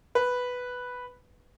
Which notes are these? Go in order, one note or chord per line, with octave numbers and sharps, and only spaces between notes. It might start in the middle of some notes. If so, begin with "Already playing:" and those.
B4